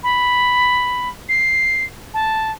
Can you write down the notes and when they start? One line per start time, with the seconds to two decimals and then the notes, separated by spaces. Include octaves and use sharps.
0.03 B5
1.29 C7
2.14 A5